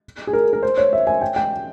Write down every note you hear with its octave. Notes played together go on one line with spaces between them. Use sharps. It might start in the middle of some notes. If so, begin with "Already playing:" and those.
G#4
A#4
A#4
C5
C#5
E5
G#5
G5
G5